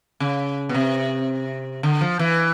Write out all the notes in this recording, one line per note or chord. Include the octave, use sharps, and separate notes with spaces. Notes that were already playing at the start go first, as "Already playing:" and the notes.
C#3
B2
C3
D3
F3
E3